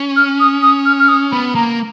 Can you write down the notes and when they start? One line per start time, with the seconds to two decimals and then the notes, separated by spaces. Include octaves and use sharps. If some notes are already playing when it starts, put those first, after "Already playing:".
Already playing: C#4
0.16 F6
0.40 D#6
0.62 D#6
0.85 F6
0.99 F6
1.08 D#6
1.32 B3 B5
1.55 A#3 A#5